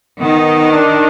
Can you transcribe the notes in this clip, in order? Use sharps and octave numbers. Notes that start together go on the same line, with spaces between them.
D#3 B3
D4